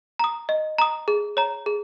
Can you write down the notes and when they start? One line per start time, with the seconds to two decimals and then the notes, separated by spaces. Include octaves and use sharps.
0.19 A#5 D#6
0.49 D#5
0.78 A#5 D#6
1.08 G#4
1.37 C#5 A#5
1.66 G#4